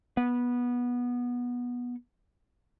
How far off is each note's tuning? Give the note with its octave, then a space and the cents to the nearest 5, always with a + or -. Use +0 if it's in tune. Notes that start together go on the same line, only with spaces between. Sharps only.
B3 -15